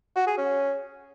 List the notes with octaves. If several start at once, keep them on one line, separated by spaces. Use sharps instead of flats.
F#4
G#4
C#4